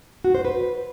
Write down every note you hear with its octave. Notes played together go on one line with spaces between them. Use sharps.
F#4
C5
B4